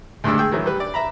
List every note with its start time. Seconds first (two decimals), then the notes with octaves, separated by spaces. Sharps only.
0.24 D2 G2 G#3 D4 E6
0.38 G#4 G5 E6
0.52 D#3 E3 F#3
0.66 G3 B4
0.80 D5
0.94 E5 A#5 B5